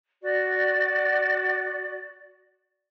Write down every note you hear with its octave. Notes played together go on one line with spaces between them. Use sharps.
F#4 D5